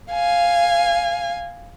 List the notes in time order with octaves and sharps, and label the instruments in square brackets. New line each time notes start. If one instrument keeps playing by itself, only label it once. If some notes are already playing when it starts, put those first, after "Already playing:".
[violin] F5 G#5